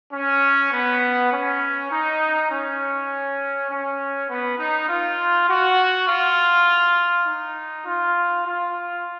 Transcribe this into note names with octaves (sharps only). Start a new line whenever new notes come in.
C#4
B3
C#4
D#4
C#4
C#4
B3
D#4
F4
F#4
F4
D#4
F4
F4